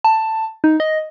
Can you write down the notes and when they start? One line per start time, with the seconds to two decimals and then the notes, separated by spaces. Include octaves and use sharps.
0.04 A5
0.64 D#4
0.80 D#5